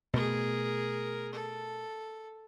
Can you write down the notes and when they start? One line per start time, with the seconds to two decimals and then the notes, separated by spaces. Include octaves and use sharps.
0.13 B2 A3 G#4 A#4
1.33 A4